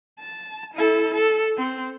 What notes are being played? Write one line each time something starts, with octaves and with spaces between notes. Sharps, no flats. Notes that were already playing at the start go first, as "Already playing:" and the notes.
A5
E4 A4
A4
C4